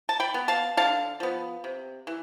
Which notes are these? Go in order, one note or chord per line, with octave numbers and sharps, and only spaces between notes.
A5
G5 B5
B3
F5 A5
D3 F5 A5
F3 B3
C3
E3